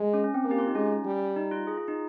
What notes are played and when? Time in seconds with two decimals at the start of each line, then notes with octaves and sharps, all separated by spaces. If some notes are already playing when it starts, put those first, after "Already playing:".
Already playing: G#3
0.14 C#4
0.24 C#4
0.34 C4
0.44 A#3
0.51 G4
0.58 F4
0.67 D#4
0.75 G#3 C#4
1.05 G3
1.36 D#4
1.51 F4
1.67 G#4
1.77 F4
1.88 D#4